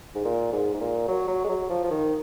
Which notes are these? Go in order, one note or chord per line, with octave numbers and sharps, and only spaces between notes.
G#2
A#2
G#2
G#2
A#2
F#3
F#3
G#3
F#3
F3
F3
D#3